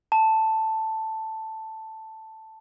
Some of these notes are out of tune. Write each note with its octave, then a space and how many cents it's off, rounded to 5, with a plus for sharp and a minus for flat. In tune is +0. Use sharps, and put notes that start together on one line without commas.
A5 +5